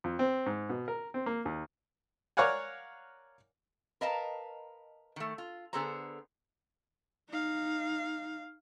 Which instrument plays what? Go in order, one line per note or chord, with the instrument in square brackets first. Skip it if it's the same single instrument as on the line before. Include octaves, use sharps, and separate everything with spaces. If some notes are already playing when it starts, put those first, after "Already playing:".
[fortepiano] F2
C4
G#2
B2
A#4
C4
A#3
D#2
A#4 C#5 D5 F5 F#5 G#5
[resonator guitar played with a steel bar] A#4 B4 D#5 F5 A5 A#5
D#3 A3
F4
D3 B3 G#4 A4 C5 A#5
[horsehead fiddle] D#4 F5